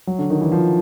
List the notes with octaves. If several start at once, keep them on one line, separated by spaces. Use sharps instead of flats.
F#3
D3
D#3
E3
F3